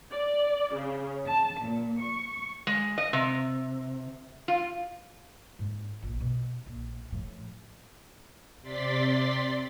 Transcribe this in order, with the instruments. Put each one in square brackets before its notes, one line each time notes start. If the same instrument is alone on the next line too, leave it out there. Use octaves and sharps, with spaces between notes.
[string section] D5
C#3
A5
A#2
C#6
[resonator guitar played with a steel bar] G#3
D#5
C3
F4
[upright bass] G#2
A#1 F4
B2
A#1
A2 F3
[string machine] C3 D5 C6 A6 B6